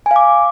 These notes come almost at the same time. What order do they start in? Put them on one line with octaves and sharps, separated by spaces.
G#5 F5 D6